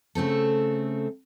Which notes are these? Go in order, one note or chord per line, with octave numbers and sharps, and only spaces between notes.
C#3 A3 C4 A4